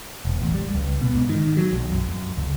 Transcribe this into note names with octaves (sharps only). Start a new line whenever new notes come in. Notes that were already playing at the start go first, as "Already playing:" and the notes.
E1
A1
G3
C#2
B2
G#2
D#3
F#3
B1
F#2
F#2
C#2